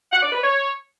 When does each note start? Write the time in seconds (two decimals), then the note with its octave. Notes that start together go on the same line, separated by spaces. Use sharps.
0.12 F#5
0.22 D5
0.32 B4
0.43 C#5